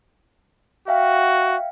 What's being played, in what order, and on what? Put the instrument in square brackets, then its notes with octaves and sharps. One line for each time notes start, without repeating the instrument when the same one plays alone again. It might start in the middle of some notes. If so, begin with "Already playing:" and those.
[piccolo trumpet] F#4 [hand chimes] E5 F5 G5